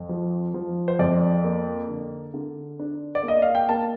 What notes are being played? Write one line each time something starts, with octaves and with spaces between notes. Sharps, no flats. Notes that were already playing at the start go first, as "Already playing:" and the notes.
Already playing: F2
F3
F3
C5
F2 D5
A#3
D3
D3
D4
D5
A#3
D#5
F5
G5
A#3 A5